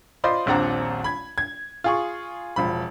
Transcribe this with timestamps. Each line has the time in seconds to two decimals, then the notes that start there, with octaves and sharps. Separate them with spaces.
0.24 F4 C5 D5 D#5 B5 C6
0.46 D#1 A#1 C4 D4 F#5 A#5
1.04 B5 G#6
1.38 G#6
1.84 F4 G#4 C#6
2.56 E1 F3 B5